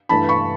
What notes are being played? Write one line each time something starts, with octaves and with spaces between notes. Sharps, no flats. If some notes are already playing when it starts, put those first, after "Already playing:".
G2 E3 A3 A5 B5
B5 C#6